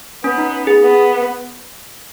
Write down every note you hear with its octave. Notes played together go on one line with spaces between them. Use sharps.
B3 C#4
D#4
G#4
B3